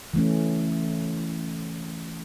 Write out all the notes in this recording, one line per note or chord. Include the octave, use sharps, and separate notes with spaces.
E3 A3 C#4